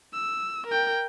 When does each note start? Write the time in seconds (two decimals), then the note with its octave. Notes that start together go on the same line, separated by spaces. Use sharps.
0.13 E6
0.67 A#4 G5